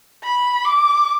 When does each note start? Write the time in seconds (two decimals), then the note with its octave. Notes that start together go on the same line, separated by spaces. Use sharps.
0.24 B5
0.65 D6